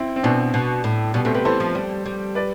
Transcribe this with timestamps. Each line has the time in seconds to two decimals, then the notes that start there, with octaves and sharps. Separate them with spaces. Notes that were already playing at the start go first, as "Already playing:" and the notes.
Already playing: C4 E4
0.16 C4
0.23 B2 B3 D4
0.54 B2
0.84 A2
1.14 B2 G3 B3
1.25 B2 A3 C4
1.34 C3 G4 B4
1.45 E3 A4 C5
1.60 F3
1.75 G3
2.06 G3
2.35 B4 D5